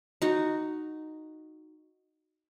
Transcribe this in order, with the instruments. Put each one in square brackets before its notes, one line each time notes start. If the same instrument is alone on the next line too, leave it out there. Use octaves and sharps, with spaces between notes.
[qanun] D#4 F#4